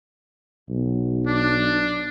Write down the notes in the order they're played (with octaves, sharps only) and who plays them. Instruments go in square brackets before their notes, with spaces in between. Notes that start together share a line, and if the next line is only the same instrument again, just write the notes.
[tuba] B1
[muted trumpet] D4